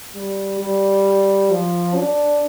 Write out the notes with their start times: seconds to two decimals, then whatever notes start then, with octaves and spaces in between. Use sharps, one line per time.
0.15 G3
0.61 G3
1.51 F3
1.97 D4